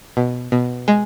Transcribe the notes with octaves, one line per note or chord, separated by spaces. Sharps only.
B2
B2
G#3